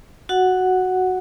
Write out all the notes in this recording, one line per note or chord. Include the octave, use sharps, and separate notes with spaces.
F#4 F#5